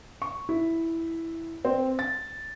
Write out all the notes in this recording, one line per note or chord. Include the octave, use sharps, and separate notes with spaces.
C#6
E4
C4
A6